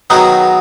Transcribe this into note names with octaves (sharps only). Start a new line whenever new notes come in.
D#3 F#3 B3 D#4 G#4